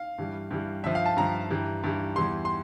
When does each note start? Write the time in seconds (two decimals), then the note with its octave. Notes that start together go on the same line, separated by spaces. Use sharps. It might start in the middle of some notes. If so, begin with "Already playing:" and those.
Already playing: F5
0.18 G2 E3 G3
0.51 G2 E3 G3
0.84 G2 F3 E5
0.95 F5
1.06 A5
1.17 G2 F3 A#5
1.50 G2 E3 G3
1.84 G2 E3 G3
2.16 E2 E3 G3 C6
2.45 C6